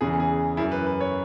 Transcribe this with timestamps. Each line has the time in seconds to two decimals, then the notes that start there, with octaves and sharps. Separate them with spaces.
0.01 E2 C#3 E3 G#4
0.20 G#4
0.57 F#2 E3 E4
0.72 B4
0.87 B4
1.00 C#5